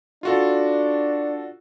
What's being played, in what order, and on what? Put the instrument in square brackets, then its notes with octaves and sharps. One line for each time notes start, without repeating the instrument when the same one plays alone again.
[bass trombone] D4 [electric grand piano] F4 F#4 A4